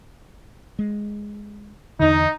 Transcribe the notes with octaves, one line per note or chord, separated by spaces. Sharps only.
G#3
E2 D3 D#4